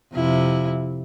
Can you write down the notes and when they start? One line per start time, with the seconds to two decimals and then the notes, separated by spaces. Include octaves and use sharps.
0.13 F2 C3 E4